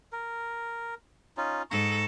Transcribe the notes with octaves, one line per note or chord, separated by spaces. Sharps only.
A#4
C#4 D#4 F4
G#2 A4 A#5 C#6